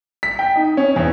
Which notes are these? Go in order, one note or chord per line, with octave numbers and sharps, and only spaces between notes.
B6
G5
D#4
C#4
E2